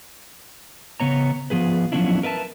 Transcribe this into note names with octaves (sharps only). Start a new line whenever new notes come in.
C#3 B3 C#5 A#5
F3 B3 G#4 B4
F3 F#3 B3 C#4 D4 E4
A#4 B4 E5 A5